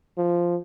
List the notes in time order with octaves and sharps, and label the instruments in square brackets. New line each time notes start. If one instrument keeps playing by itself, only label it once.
[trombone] F3